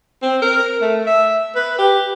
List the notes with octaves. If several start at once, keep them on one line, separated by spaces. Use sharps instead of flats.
C4
A#4
A3
E5
B4
G4